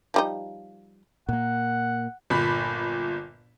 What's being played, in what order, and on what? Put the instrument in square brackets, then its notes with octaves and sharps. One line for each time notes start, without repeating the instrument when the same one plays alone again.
[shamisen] F3 G3 D#4
[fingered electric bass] A#2 A#3 [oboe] F#5
[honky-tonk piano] G1 A#2 B5 B6